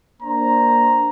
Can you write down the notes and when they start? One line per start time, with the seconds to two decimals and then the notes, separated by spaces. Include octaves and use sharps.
0.22 A#3 D4 C5 A#5